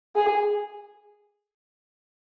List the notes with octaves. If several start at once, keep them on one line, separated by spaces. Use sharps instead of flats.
G#4